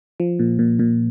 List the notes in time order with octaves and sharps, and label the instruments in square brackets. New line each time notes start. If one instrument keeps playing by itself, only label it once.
[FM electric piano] F3
A#2
A#2
A#2